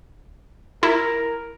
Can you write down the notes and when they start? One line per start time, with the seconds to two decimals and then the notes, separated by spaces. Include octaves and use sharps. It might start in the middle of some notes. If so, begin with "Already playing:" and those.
0.83 E4 A#4